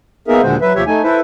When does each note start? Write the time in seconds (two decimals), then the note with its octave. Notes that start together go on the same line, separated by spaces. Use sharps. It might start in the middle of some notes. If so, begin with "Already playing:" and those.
0.28 A#3 B3 D#4 G#4 A#4 E5
0.43 D#2 A#2 D3 G#3 F#4 C5
0.61 F#3 B4 E5
0.75 D#2 C3 F3 G4 C#5 E5
0.87 A3 D#4 G#5
1.03 E4 A4 B4 C5 E5